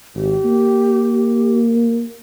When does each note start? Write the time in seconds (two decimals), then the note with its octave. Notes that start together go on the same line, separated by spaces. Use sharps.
0.15 G#1 G4
0.45 A#3